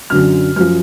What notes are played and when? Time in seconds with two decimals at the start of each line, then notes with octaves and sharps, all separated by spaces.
0.10 F#2 D3 F#3 F6
0.56 F#2 F3 F6